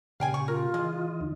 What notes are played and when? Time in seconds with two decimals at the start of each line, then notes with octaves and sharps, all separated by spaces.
0.20 A#2 C#3 G4 F5 G5 G#5
0.34 C#6
0.48 F4 A#4
0.74 E3 G#3 D#5
1.21 D#2 D3 D#4